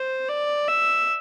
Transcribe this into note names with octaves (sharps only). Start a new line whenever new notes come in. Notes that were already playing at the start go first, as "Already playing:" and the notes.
Already playing: C5
D5
E5